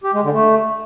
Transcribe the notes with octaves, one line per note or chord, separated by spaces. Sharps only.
G4
G#3
D3
A3